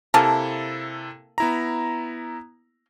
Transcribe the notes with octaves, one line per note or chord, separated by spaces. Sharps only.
C3 A#3 E4 A4 G#5 A5
B3 E4 A#5